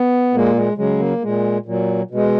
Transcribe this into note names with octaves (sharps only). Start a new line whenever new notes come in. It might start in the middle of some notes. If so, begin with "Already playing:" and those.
Already playing: B3
A#2 G#3 A#3
G#3
C#3 F#3 G#3
A#3
A#2 G#3
A#2 F#3
B2 G#3